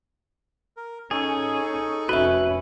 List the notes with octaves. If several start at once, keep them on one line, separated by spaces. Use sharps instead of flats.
A#4
C#4 D#4 G#4 A4 C#6
F1 C#4 F#4 B4 E5